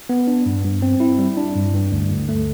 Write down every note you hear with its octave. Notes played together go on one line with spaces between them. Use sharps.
B3
D4
G2
G2
C4
E4
G3
D4
G2
G2
D2
D2
A3